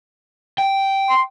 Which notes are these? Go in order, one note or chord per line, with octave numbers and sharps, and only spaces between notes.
G5
C6